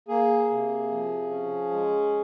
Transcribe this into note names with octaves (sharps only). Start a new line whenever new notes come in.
A#3 G#4
C3
F3
C#4
G#3